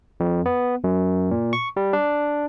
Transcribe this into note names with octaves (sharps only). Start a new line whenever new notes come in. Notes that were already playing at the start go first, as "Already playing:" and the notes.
F2
B3
F#2
A#2
C#6
G3
D4